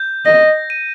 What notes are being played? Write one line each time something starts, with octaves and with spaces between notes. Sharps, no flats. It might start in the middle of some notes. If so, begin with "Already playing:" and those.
Already playing: G6
D#5 A#6
D#7